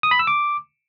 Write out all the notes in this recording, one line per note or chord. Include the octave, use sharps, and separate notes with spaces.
D#6
B5
E6
D6